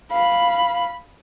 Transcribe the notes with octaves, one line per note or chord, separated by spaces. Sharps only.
F5 B5